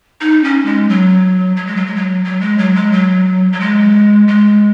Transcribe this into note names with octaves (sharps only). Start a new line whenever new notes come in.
D#4
C#4
G#3
F#3
F#3
G#3
F#3
G#3
F#3
F#3
G#3
F#3
G#3
F#3
F#3
G#3
G#3